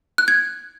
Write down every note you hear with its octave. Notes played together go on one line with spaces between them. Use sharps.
F#6
G#6